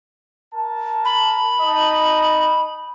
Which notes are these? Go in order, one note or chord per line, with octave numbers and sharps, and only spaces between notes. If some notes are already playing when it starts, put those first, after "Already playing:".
A#4 A5
B5
D#4 D#5 A5